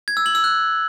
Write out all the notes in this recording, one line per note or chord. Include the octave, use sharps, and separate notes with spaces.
G#6
E6
F#7
E6
F#6